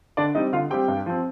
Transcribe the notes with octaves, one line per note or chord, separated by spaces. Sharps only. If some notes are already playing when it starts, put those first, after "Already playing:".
D3 D4 D5
G3 C4 D#4 D#5
D3 F4 F5
G3 C4 G4 G5
G2
F3 C4